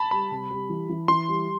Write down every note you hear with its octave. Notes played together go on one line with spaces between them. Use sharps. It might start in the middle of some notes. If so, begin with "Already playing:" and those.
Already playing: A5 B5
G3 B5
C3
G3
E3
E3
E3 C6
G3